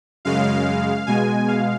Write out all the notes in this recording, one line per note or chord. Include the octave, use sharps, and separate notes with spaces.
F#2 C#3 G#3 F5
B2 G#3 G#5
F5